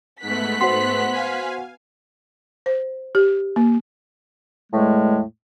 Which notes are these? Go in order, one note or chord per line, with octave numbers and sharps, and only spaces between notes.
G#2 A3 B3 F#6 B6
F#4 C5 C6
F5 G#5
C5
G4
A#3
E2 A2 G#3 A3